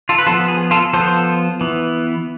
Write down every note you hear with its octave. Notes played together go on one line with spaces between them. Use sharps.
F4 A4
B4
F3 B3 F4 A4
G#4
F4 A4
F3 B3 A4 C5
E3 B3